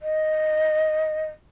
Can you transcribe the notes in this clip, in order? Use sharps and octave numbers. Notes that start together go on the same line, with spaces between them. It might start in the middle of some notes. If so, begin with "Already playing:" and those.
D#5